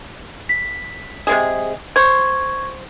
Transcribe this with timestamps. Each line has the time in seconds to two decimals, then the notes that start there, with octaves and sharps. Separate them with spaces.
0.49 B6
1.27 C3 G#3 G#4
1.96 C5 C#6 G#6